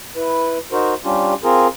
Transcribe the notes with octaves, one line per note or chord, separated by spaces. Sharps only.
E4 B4
D#4 F#4 A#4 C5
G3 C#4 D4 F4 G4
C4 F4 G#4 A#4